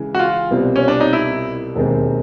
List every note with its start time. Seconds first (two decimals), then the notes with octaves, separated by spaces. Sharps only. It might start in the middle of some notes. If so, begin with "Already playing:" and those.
Already playing: C#3 E3 G#3
0.15 F#4
0.19 F4
0.51 C2 B2 G3 C4 F4
0.76 C#4
0.88 D4
1.00 D#4
1.13 E4
1.75 E1 D#2 D#3 G#3 C4